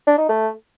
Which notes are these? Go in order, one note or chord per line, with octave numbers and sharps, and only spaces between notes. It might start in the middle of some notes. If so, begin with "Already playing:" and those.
D4
D#4
A3